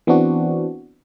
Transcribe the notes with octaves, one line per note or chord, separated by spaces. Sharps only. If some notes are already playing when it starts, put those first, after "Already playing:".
E3 B3 C4 D4 F#4